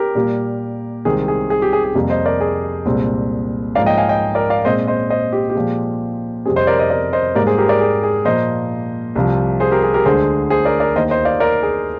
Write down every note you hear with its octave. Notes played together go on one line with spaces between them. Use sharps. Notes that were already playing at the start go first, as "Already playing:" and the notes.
Already playing: G4 A#4
A#2 G3 A#3
C2 C3 D#3 G#3 C4 G#4
G#4
G#4
G4
G#4
G#4
F2 C3 G3 A#3
C5 D#5
A#4 D5
G#4
C2 A#2 G#3 C4
G#2 F3 A#3 D5 F5
D#5 G5
F5 G#5
D#5 G5
A#4 D5
D5 F5
A#2 G#3 C4 C5 D#5
C5 D#5
C5 D#5
G4
G4
A#2 F3 G#3
F2 C3 G3 C4 G#4
C5 D#5
A#4 D5
C5 D#5
A#4 D5
C5 D#5
G#2 G3 A#3 A#4 D5
G#4 C5
G4 A#4
A#4 D5
G#4
G#4
A#2 F3 A#3 C5 D#5
C2 C3 F3
G#4 C5
G4 A#4
G#4
G4 A#4
D2 D3 G#3 G#4 C5
G#4 C5
A#4 D5
A#4 D5
D#2 D#3 A#3 C5 D#5
C5 D#5
D5 F5
A#4 D5
G#4